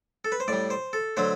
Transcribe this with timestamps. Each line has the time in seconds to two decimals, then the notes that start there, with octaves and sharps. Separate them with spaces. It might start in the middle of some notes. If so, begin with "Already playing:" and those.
0.25 A4
0.32 B4
0.40 C5
0.48 A2 G3 D5
0.70 C5
0.93 A4
1.17 D3 F#3 A3 C5